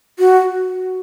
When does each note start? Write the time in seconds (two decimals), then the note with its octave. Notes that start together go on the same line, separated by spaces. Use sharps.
0.19 F#4